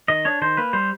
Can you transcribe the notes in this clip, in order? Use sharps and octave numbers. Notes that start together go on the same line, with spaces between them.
D#3 D#5
D4 C#5
D#3 C5
A#3 B4
G3 C5